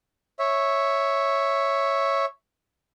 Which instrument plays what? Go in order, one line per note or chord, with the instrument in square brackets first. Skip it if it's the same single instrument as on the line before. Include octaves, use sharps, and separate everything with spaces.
[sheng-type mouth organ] C#5 E5